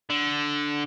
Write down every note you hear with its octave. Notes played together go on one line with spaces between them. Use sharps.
D3